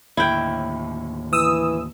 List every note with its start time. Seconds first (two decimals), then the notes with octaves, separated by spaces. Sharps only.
0.17 D#2 A2 D3 E4 G5
1.33 E3 D#6 E6